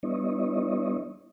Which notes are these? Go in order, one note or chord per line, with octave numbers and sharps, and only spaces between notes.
G3 B3 D4 E4 C#5 D#5